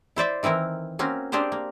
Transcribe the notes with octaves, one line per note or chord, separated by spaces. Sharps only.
E4 C5 D5 E5
D#3 E3 C4 E4 A#4
A#3 C4 C#4 F#4
A#3 C4 D4 G4 G#4 C5
A#3